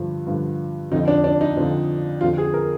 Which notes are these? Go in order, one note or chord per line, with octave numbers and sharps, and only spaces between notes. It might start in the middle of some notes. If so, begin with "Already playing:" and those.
Already playing: G2 D3 F3
G2 D3 F3
F2 D3 F3 D#4
D4
D4
D#4
F2 D3 F3
F2 D3 F3 F4
G#4
A#4